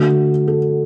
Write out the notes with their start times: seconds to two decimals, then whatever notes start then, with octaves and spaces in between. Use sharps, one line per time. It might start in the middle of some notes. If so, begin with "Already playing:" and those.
Already playing: D3 A3 F#4
0.48 A4